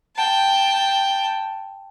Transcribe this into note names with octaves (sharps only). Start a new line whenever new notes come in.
G5 A5